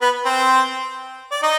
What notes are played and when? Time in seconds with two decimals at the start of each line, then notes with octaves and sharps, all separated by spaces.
0.02 B3 B4
0.25 C4 C5
1.32 D5
1.43 D#4 D#5